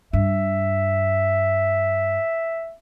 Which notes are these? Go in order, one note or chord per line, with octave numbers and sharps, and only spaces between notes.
G2 E5